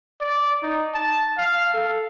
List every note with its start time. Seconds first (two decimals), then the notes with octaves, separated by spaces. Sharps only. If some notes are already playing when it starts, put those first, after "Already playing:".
0.21 D5
0.63 D#4
0.94 A5
1.38 F5
1.74 A4